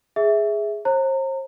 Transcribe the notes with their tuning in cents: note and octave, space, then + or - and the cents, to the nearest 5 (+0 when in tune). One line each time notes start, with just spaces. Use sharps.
G#4 +0 E5 -10
C5 +40 A#5 -30